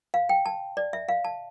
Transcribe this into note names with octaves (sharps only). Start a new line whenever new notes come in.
F5
G5
A5
D5
E5
F5
A5